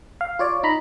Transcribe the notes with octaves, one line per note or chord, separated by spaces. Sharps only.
F5
F4 C#5 D5
D#4 A#5 B5